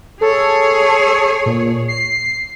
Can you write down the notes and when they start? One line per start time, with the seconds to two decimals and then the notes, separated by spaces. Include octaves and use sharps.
0.21 G#4 A4 C#5
1.46 A#2
1.88 C7